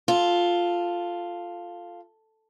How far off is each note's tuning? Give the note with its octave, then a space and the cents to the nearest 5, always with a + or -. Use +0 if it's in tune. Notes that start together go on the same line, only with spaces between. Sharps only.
F4 +0 A4 +0